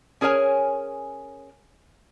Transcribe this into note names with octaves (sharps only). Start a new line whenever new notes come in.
C#4 G#4 A#4 C#5 G#5